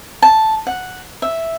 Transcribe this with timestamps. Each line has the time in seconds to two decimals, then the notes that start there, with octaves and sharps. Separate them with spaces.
0.22 A5
0.67 F#5
1.22 E5